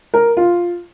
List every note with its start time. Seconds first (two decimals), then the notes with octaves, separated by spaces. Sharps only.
0.14 A#4
0.37 F4